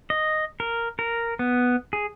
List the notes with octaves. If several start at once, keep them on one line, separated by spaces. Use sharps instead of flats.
D#5
A#4
A#4
B3
G#4